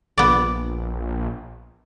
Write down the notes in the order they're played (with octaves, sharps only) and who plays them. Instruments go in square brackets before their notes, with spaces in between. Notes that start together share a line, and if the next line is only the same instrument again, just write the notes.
[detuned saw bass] A#1 [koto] B3 D5